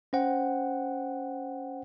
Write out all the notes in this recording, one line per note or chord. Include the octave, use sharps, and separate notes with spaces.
C#4 C5 F#5 G5